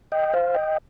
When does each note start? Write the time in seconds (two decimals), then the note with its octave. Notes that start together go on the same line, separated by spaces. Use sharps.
0.12 D#5 G5
0.33 C5 F5
0.54 D#5 G5